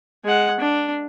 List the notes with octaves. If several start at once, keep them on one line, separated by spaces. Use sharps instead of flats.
G#3 F#5
D4